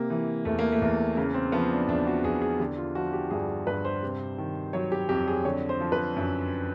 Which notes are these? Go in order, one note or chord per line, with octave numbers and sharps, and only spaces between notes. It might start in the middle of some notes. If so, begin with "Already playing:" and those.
Already playing: C3 A#3
E3
E2 A3
A#3
A3
E2
C#3 A#3
C4
F3 B3
D4
E2 D4
F#4
E2 G#4
G#4
D3 G4
F4
F3 F#4
G4
G2 G#4
G2 B4
C5
C3
D#3
F#3 C#5
G4
F2 G4
G#4
D3 C#5
C5
F3
B4
F#2